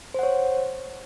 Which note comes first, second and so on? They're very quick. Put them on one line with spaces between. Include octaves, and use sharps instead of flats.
C5 F#5 C#5